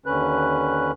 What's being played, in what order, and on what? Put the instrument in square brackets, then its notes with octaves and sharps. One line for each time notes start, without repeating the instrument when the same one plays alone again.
[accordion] D#2 D3 C#4 B4 F#6